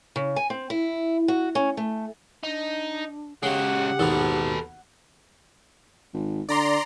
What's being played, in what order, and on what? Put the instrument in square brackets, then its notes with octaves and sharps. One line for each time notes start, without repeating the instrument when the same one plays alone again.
[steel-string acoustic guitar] C#3
G#5
C4
E4
F#4
C#4
A3
[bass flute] D4 [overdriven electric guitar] D#4
[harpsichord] C#3 [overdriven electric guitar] G#3 F#4 [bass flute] G4 [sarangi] F#5
[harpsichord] D#2 G#2 B2 [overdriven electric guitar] A4 B4
[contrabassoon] G#1
[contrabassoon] D3 [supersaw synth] D5 A#5 C6